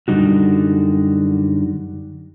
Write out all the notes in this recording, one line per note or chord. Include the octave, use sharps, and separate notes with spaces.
F#2 D3 G3 D#4 F#4